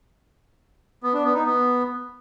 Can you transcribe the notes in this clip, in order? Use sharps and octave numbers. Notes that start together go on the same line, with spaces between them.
B3
D4
B3
D#4
B3